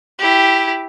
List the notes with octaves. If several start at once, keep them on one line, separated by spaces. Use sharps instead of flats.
E4 G4